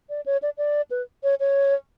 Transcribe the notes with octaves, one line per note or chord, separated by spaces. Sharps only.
D5
C#5
D5
D5
B4
C#5
C#5